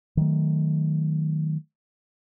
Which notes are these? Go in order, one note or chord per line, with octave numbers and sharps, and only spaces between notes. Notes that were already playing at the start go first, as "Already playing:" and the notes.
D#3 F#3 A3